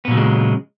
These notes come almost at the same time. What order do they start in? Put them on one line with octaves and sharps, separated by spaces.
B3 A#2 F#3 C#3 G#3